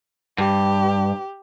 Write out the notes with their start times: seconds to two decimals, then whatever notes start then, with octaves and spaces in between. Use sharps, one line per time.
0.38 G2 G4